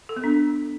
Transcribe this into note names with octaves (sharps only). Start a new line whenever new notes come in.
A4
B3
D4